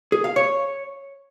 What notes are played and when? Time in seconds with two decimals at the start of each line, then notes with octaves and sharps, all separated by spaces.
0.12 G#4
0.24 F5
0.36 C#5